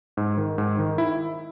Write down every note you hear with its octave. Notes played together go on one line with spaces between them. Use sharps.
G#2
D#3
G#2
D#3
E4